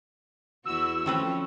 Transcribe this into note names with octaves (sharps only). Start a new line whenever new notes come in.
E2 E4 F#4 E6
F3 A3 C4 C#4 B4